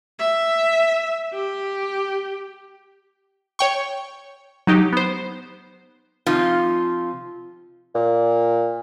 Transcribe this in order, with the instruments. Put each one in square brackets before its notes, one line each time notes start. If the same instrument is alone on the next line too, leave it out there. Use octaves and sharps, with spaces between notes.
[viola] E5
G4
[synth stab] C#5 G5 C#6
F#3 D#4 G4
B3 C5
[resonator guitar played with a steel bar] C3 F3 C4 D#4 F4
[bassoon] A#2